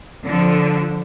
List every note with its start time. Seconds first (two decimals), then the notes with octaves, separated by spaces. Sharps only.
0.23 D3 F3